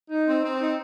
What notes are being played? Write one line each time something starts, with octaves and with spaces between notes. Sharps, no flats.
D#4
C4
C4
D#4